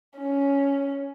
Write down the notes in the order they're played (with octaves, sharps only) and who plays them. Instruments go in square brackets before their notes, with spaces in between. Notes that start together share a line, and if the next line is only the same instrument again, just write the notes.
[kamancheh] C#4